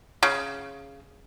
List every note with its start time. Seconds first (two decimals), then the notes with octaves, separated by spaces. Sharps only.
0.23 C#3